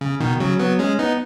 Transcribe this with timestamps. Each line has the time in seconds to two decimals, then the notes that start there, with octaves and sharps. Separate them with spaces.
0.01 C#3
0.20 B2 D#3
0.40 C#3 F#3
0.59 F#3 B3
0.79 G#3 C#4
0.99 B3 D#4